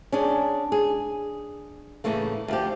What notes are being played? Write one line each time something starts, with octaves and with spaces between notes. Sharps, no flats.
C#4 D4 G#4
G#4
A2 C#3 E3 A3 A#3
D2 F3 G4